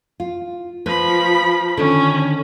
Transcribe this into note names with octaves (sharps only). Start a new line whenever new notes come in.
F4
F3 B4 B5
D3 D#3 C#4